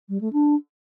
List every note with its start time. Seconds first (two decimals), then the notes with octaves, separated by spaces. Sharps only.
0.09 G3
0.21 A3
0.33 D4